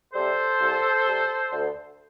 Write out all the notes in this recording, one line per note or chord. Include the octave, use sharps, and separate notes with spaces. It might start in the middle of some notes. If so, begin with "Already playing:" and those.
C3 G3 A4 C5
C2
C3 G3
D2